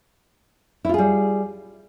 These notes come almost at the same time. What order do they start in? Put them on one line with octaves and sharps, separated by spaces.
E4 F4 G#4 G3